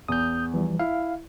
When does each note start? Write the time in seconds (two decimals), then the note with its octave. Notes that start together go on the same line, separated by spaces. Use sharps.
0.08 E2 D#6 G6
0.54 E3 F3 G3
0.79 E4 F5